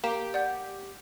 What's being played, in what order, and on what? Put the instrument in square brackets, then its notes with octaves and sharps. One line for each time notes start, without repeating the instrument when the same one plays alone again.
[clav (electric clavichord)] A#3 [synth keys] G4 [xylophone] E7
[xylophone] D5 F#5 G6